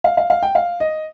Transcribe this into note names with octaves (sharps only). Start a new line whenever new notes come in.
F5
F5
F5
G5
F5
D#5